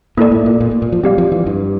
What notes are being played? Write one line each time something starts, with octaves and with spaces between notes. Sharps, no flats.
A2 A#3 E4 A4 D5
A2
A#2
A#2
A#2
A#2
F3
G3 C4 G4 D5 F5
F3
E3
G2